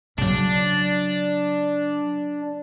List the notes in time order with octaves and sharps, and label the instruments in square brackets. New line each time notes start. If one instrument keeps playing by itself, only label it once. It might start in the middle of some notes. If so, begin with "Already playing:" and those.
[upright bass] C#3 F#3 [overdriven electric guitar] D4